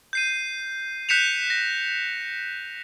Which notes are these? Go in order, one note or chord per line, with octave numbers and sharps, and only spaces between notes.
G6 C7 D#7
F#6 G6 B6 C#7 E7 F7
A#6